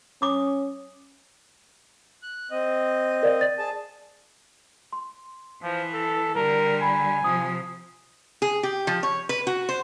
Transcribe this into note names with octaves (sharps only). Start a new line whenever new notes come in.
C#4 D6 D#6
F#6
C4 D#5
A#4 D5 F5
D5 A6
G#4 A5
C6
E3 F3
A4
D3 G3 A#4
G#5 B5
C3 F3 D#6
G#4
G4
F3
C#5
B4
F#4
C5